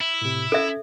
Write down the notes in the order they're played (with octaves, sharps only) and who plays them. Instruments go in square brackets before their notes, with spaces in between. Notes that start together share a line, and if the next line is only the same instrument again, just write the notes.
[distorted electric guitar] E4
[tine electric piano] A2 C3
[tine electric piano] C#4 G#6 [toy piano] A4 E5